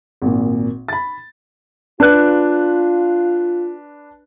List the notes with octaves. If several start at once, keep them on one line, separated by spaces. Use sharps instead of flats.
G#1 A#2
B5 A6
D4 F4 B4 F#6